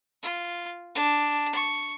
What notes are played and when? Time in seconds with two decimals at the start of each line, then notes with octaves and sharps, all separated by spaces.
0.23 F4
0.95 D4
1.55 C#6